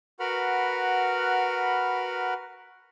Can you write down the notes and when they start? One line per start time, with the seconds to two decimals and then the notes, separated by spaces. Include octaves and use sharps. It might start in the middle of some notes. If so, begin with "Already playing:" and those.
0.20 F#4 A#4 B4 F#5 B5 F6